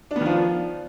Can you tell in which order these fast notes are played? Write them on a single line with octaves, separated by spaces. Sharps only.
D4 B3 D#3 F3 F4